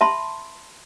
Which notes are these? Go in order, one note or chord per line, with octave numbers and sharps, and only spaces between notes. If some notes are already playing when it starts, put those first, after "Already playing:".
E5 A5 B5 C6